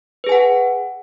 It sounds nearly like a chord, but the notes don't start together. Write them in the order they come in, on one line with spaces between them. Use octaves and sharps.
B4 G#4 G#5 F#5